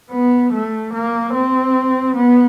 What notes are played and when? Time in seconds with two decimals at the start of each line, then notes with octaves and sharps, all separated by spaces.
0.12 B3
0.53 A3
0.93 A#3
1.34 C4
2.15 B3